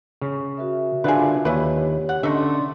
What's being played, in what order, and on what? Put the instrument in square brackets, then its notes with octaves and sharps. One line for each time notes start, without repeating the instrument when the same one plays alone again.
[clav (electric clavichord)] C#3
[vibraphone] F#4 A#4 E5
[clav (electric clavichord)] D3 D4 F4 [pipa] G#4 B4
[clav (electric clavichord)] D#2 [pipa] E4 B4 [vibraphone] G4 C#5
[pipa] F#5
[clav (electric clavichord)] D3 [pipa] A3 D#4 E5 [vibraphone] C#4 D5 C6